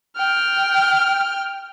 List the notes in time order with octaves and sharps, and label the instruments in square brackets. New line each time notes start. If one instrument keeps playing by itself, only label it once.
[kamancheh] G5 F6